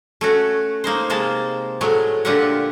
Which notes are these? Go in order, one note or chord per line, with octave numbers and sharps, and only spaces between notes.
A3 C#4 F#4
A#3 D#4 C5
C3 G#3 A#3 C5 A5
A2 F#3 G#3 A3
A#2 D3 F4 G4 E5 F#5